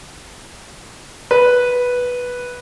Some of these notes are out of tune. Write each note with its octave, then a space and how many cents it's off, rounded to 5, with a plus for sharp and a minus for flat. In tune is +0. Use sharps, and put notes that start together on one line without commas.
B4 -5